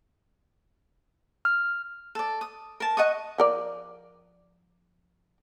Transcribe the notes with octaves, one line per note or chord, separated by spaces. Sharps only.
F6
A4 D5
D#6
A#4 A5
D#5 F#5 C#6 D#6
F3 A#4 D5